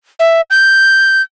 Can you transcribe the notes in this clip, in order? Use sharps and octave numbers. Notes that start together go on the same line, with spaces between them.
E5
G6